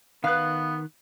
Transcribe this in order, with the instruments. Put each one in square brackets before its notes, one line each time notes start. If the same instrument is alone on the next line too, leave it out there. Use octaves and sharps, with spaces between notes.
[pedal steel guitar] D#3 F#6 [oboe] B3 [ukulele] B4 F5